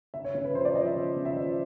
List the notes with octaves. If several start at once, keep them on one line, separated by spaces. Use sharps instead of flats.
C#3 E5
C#5
C#3 C#5
B4
F3 C5
D5
F3 D#5
E5
C#3
C#3
E5
F3 D#5